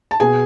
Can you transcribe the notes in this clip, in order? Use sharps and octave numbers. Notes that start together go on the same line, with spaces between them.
A5
B2 G#4 G#5